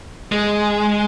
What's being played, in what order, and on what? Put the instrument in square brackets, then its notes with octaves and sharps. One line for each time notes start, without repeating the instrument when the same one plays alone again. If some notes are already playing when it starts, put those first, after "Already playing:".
[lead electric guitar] G#3